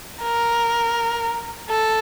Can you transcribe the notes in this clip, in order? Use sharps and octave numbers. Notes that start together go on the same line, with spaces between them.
A#4
A4